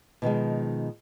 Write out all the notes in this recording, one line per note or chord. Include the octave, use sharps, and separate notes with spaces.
B2 D#3 F3 G#3